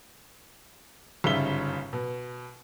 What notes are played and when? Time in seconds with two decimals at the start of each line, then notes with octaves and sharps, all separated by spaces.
1.24 G1 G#2 C#3 G3 E5 G7
1.93 B2